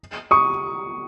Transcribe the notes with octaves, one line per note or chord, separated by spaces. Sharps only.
C#6 D#6